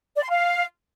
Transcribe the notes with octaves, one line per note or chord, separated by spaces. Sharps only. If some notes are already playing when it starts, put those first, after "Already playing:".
D5
C6
F5